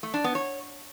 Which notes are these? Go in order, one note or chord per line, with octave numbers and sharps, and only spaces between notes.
A3
D4
B3
C#5